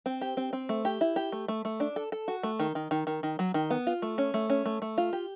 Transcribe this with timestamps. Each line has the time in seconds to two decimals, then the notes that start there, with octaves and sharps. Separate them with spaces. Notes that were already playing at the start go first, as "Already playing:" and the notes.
0.06 C4
0.21 G4
0.37 C4
0.53 C4
0.69 A3
0.85 G4
1.01 E4
1.16 G4
1.32 A3
1.48 A3
1.65 A3
1.80 D4
1.96 A4
2.12 A4
2.28 F#4
2.43 A3
2.59 D#3
2.75 D#3
2.91 D#3
3.07 D#3
3.23 D#3
3.39 F#3
3.54 D#3
3.70 B3
3.87 F4
4.02 A3
4.18 C#4
4.34 A3
4.50 C#4
4.66 A3
4.82 A3
4.98 F4
5.13 G4